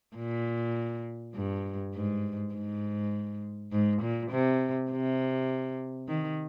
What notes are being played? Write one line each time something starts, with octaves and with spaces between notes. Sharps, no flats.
A#2
G2
G#2
G#2
G#2
A#2
C3
C3
D#3